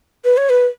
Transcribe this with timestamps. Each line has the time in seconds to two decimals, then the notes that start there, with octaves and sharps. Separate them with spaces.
0.25 B4
0.37 C#5
0.50 B4